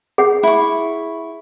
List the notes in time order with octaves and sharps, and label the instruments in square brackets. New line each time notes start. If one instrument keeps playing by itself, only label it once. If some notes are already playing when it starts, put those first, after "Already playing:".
[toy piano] G#4 F#5
[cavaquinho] E4 C#6